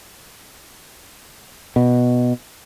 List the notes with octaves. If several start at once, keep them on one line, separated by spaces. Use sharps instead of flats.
B2